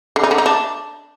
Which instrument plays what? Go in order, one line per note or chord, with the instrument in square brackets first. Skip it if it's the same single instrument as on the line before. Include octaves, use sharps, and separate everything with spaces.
[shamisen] D3
D#4
D3
D#4
D4